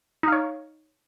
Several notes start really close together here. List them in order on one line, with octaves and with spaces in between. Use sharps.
D#4 F5 C#5